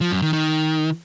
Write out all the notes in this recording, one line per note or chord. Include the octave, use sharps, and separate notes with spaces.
F3
F#2
D#3
D#3